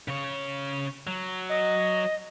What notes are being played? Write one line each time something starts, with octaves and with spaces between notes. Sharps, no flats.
C#3 C#5
F#3
D#5